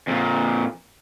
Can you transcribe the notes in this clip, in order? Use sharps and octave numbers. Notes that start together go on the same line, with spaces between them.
F2 A#2